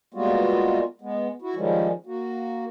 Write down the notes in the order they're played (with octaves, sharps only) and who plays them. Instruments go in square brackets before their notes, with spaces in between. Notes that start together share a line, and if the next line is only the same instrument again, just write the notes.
[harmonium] G3 G#3 A#3 B3 F4 F#4
G#3 B3
E4 F#4
D#3 F3 G3 G#3 C#4
A#3 F#4